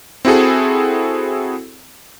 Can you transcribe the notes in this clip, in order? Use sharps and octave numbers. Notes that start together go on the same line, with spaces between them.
C4 E4 F#4 G#4 A4